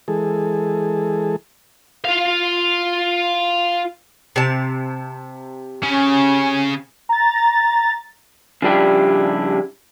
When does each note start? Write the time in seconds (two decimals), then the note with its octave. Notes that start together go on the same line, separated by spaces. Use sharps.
0.08 E3 G#3 G#4 A4
2.05 F4 F5
4.36 C3 A5
5.83 C#3 C#4
7.09 A#5 A6
8.62 C#3 F3 G3 D4 E4 G4